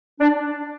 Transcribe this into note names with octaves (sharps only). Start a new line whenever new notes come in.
D4